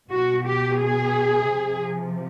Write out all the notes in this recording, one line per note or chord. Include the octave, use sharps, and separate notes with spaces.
B2 F#4
G4
G#4
C3 F3